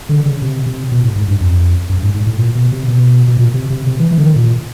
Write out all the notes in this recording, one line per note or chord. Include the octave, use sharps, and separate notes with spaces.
D3
C#3
C3
C3
B2
A2
G#2
G2
F2
F#2
G#2
G#2
A2
A#2
B2
C3
B2
B2
A#2
C3
C3
C3
E3
E3
D3
D#3
A#2